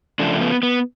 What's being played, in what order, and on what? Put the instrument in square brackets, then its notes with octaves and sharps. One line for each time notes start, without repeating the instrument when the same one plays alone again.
[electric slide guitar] C#3 F3 A3 D4
B3
B3